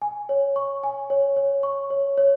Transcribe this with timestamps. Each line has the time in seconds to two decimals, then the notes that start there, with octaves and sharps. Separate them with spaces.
0.02 G#5
0.29 C#5
0.56 C#6
0.83 G#5
1.10 C#5
1.36 C#5
1.63 C#6
1.90 C#5
2.18 C#5